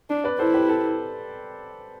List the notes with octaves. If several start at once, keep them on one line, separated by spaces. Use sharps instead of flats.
D4
B4 D5
E4 A4 C5
G4 B4
A4